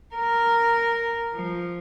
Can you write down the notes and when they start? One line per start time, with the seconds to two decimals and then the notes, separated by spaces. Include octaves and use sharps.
0.15 A#4
1.35 F3